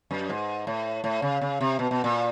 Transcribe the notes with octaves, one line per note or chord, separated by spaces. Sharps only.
F#2
G#2
A2
A2
C#3
C#3
C3
B2
B2
A#2